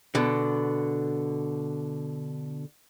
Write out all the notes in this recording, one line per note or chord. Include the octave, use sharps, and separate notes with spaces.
B2 D3